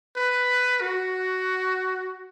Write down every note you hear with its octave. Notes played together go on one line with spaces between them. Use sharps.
B4
F#4